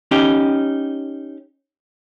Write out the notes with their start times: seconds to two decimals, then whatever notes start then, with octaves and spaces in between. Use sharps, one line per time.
0.11 C#4 D#4 G4